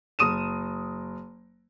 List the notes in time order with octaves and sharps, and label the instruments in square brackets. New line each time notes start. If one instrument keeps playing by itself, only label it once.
[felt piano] F#1 D#6 D#7 E7